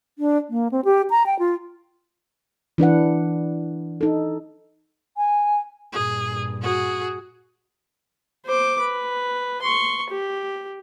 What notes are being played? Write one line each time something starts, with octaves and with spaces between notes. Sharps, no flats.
D4
A#3
C4
G4
A#5
G5
F4
E3 D4 B4 F#5
D#4 A4
G#5
G2 A#2 G#4
F#4 G#4
C5 D6
B4
C6 C#6
G4